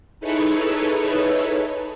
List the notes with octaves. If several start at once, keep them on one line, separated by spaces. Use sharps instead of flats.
D#4 E4 G#4 A4 B4 C#5